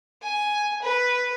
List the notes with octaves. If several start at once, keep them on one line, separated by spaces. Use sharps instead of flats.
G#5
B4